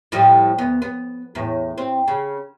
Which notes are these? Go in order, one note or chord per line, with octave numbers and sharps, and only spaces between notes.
A2 F3 G3
D2 B3
B3
E2 A2
C4
C#3